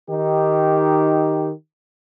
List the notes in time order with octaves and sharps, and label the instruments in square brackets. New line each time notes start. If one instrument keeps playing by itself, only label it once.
[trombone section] D#3 D#4 G4